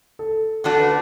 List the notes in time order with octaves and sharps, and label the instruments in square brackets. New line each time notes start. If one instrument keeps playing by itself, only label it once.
[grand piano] A4
[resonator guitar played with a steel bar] D3 A3 D4 F#4 [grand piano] A4
[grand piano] B4